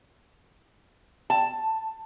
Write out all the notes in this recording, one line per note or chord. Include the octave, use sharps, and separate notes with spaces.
A5